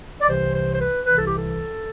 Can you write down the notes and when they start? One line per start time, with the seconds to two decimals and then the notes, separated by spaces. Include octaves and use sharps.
0.21 D5
0.28 C2 C3 E3 C5
0.54 C5
0.74 C5
0.80 B4
1.04 C2 C3 E3 B4
1.16 A4
1.27 G4
1.38 A4